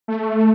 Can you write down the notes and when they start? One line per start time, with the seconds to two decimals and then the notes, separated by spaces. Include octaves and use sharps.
0.08 A3